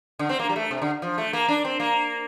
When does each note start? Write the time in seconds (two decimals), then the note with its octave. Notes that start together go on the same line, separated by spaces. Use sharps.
0.19 D3
0.29 C4
0.40 A#3
0.49 G3
0.56 A3
0.71 C3
0.82 D3
1.02 F3
1.18 A3
1.33 A#3
1.48 D4
1.65 C4
1.80 A#3